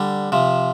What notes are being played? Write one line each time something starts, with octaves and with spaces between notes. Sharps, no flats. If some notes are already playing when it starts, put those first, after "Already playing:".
Already playing: D3 G3
C3 F3